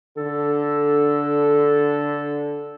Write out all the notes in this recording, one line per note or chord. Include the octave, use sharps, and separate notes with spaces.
D3 A4